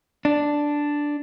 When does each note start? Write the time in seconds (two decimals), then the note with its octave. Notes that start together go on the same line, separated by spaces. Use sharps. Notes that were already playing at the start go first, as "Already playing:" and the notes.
0.25 D4